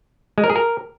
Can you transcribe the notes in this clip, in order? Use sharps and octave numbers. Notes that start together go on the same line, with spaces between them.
G#3
A#4
G#4
A#4